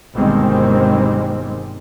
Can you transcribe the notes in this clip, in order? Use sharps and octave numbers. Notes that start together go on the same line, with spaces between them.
G1 B2 D#3 G3 G#3 C4